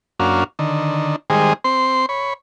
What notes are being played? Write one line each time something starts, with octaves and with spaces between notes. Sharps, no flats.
F#2 A#3 C#4 D4 F#4 F5
D3 D#3
D#3 G3 G#3 G#4 C5
C4 C5 C6
C#5 B5